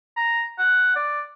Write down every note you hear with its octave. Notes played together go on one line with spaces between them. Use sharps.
A#5
F#5
D5